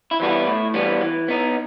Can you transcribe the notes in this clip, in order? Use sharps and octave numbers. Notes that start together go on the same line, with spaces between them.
E4
E3 G3 B3 F#4
E4
A2
E3 G3 B3
E3
B3 D#4